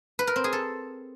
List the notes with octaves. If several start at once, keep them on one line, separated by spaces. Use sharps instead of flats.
B4
A#4
C4
G#4
A4